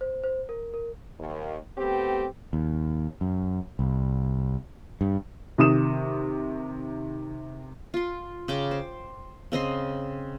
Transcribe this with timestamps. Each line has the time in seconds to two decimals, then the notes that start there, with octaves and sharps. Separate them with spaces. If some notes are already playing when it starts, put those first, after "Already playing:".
0.01 C5
0.24 C5
0.49 A#4
0.74 A#4
1.20 D#2
1.78 A3 B3 C4 G4
2.53 D#2
3.21 F#2
3.79 C2
5.01 G2
5.58 C3 D#3 D#6 E7
7.94 F4 C6
8.48 C#3 G5 D6
8.71 C5
9.52 C#3 C4 D#5 C6